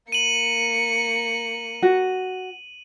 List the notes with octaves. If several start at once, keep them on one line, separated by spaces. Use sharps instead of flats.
A#3 C#7 D#7 F#7
F#4